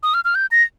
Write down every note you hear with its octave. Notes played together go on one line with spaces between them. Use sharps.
D#6
F6
F6
G6
A#6